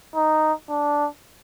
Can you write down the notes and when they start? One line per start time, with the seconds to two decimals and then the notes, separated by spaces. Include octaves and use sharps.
0.16 D#4
0.69 D4